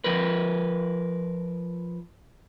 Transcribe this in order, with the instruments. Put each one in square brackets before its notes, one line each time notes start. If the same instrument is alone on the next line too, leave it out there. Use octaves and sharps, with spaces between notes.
[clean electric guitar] F3 A#4 B4